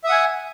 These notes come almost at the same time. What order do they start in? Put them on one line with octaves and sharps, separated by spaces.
E5 D#6 F#5 G#5